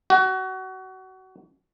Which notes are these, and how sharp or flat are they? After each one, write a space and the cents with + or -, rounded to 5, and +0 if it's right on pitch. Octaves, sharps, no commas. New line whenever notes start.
F#4 +25